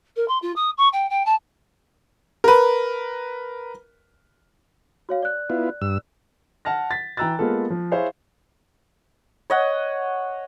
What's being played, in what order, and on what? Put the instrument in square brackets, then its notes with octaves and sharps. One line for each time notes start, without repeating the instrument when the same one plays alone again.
[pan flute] A#4
C6
F4
D#6
C#6
G5
G5
A5
[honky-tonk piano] A#4 B4
[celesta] F#4 C#5 F5
D5 F#6
[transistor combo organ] B3 E4 F4
G2 E6
[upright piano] F#5 A5 F6 A#6
A6 B6
E3 G5 A#5 E6 F#6 A6
G#3 A#3 B3 F4 A4
F3
E4 G#4 C5 C#5 E5 F5
[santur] C#5 D#5 F#5